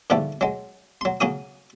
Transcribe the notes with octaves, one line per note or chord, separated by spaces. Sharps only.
G#2 D3 F3 G3 A3
F#3 G#3
F#3 C6
C#3 F#3 C#4 F#4 D#6